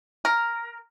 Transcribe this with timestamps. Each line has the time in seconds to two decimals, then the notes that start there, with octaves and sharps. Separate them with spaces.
0.25 A#4